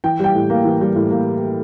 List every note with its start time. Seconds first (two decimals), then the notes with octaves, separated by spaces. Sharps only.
0.04 E3 G5
0.20 G3 G5
0.35 A2
0.50 A#3
0.65 E3
0.81 G3
0.96 A2
1.11 A#3